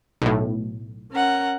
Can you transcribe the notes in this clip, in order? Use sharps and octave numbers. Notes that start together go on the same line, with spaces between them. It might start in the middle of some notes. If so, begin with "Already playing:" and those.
B1 A2
C#4 A#4 F#5